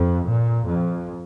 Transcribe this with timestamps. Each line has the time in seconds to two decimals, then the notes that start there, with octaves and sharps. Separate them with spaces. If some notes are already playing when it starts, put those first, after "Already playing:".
Already playing: F2
0.28 A#2
0.68 F2